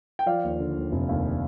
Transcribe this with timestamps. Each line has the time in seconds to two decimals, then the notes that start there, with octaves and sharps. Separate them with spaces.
0.19 G5
0.26 F3 D5 F5
0.44 D#2
0.60 D3
0.76 D#2
0.92 F1
1.09 D#2